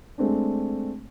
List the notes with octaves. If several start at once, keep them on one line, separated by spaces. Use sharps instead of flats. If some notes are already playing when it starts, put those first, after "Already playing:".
G#3 A3 C4 D4